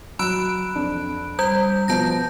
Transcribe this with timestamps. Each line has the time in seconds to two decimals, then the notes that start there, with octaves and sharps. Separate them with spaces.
0.19 F#3 A#5 B5 E6 F#6 D7
0.75 F2 D4
1.39 G3 G6
1.88 B2 F3 B3 A5 G6 A#6